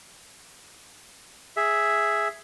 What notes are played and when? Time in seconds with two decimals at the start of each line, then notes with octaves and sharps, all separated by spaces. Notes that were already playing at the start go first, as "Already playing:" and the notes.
1.57 G#4 E5